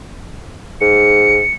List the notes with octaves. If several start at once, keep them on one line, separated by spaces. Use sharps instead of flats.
G#2 C#7